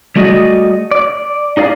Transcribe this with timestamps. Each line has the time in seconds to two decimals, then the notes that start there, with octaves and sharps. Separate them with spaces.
0.16 G3 A3 F#4 G#4 D5 D#5
0.91 D5
1.57 D#4 G#4 D5 F5